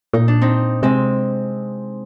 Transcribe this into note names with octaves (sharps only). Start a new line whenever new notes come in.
A#2 D#4
D4
C4 D#4
C3 G#3 C4